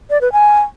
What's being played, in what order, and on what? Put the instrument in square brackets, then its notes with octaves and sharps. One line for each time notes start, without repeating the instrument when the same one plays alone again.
[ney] D5
B4
G#5